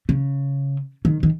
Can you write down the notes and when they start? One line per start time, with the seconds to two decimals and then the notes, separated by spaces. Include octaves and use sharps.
0.09 C#3
1.05 D#3
1.23 D#3